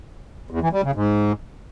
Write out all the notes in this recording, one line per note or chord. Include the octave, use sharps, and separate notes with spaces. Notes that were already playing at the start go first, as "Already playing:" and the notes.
E2
E3
G3
C#3
G#2